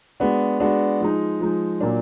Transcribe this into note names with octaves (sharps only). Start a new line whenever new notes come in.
G#3 B3 D4 F#4
G#3 B3 D4 F#4
F3 G#3 D#4
F3 G#3 D#4
A#2 F#3 A#3 D4